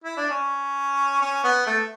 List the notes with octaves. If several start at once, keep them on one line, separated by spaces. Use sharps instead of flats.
E4
D4
C#4
C#4
B3
A3